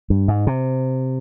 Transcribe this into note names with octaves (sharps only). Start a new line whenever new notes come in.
G2
G#2
C3